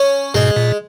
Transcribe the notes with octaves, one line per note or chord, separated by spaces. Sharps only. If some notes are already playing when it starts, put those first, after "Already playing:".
Already playing: C#4
G#2 B2 G#3
A#2